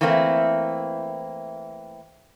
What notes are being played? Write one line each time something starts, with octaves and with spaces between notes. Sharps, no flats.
E3 A3 A#3 C4 E4